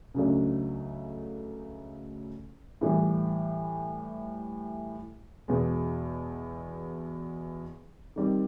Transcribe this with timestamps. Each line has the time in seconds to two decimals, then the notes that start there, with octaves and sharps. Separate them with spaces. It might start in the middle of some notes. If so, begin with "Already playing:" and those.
0.14 C#2 C#3 F#3 A3 D4
2.81 A2 E3 G3
5.48 E2 B2 G#3
8.16 D#3 G3 C4